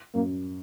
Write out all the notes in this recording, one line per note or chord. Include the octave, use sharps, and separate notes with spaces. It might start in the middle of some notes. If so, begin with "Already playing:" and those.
F#2 A#3